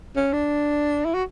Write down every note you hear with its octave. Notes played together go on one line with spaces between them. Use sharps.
C#4
D4
E4
F#4